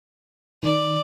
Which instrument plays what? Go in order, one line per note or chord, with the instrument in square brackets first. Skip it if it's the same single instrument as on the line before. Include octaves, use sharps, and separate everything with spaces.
[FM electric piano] D#3 [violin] D5